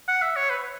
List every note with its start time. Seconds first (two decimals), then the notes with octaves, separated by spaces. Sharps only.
0.08 F#5
0.22 E5
0.36 C#5
0.50 B4